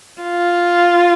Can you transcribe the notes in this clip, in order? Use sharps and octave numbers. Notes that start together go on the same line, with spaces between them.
F4